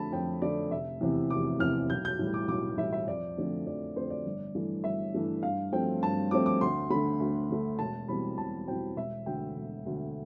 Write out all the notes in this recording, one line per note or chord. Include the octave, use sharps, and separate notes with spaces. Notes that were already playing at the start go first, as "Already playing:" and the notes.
Already playing: F2 D3 A3 A5 B5
F2 G5
D3 A3 D5
F1 E5
E2 C3 E3
F1 D6
E2 C3 E3 F6
B1 G6
G6
A2 E3 G3
D6
B1 D6
A2 E3 G3 E5
E5
F2 D5
D3 F3 A3 C4
F2 D5
D3 F3 A3 C4 C5
D5
G1
G2 E3 A3
G1 E5
G2 E3 A3
G2 F5
F3 A3 C4 G5
G2 A5
F3 A3 C4 D6
D6
D2 C6
D3 A3 B5
D2
D3 A3
E1 A5
E2 B2 G3 C4 B5
E1 A5
E2 B2 G3 C4 G5
E1 E5
D2 D3 G5
E1
D2 D3